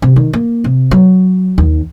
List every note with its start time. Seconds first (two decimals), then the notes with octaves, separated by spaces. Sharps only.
0.02 C3
0.16 D#3
0.33 A#3
0.64 C3
0.91 F#3
1.58 D#2